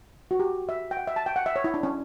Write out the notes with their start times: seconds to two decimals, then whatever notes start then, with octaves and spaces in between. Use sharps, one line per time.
0.31 F#4
0.40 G4
0.69 E5
0.91 G5
0.97 F#5
1.07 E5
1.16 A5
1.26 G5
1.36 F#5
1.46 E5
1.56 C#5
1.64 E4
1.74 D4
1.83 C#4